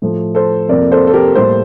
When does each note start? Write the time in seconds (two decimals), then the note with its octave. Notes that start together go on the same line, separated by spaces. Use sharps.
0.02 A2 F3 A3
0.35 A4 C5
0.68 F2 C3 F3 A#3 A#4 D5
0.92 A4 C5
1.07 A4
1.14 G4 A#4
1.35 A2 G3 A#3 A4 C5